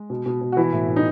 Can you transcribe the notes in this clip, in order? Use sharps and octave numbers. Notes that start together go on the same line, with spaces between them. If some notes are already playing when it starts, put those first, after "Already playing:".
Already playing: G#3
B2
B2
B2
F#4
E3 E4
A2
A2
D#4